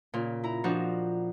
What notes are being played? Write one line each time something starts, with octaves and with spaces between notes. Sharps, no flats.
A#2 C#3
E4 A#5
F3 D4 D#4 F#4